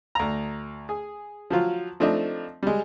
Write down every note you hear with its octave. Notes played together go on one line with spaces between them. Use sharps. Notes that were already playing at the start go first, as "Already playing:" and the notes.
D2 A#5
G#4
F3 F#3 F4
F3 A3 C4 D4 D#4 D#5
G3 G#3